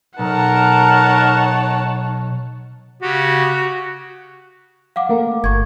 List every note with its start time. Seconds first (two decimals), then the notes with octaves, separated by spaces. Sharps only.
0.19 B1 D#4 A#4 C#5 F#5 A5
3.02 C#3 F#4 G4
4.96 F5 F#5 D6
5.09 A3 A#3 A#4
5.44 G1 C#6 G#6